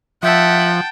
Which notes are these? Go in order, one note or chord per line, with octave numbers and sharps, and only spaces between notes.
F3 E5 F#5 G5 A5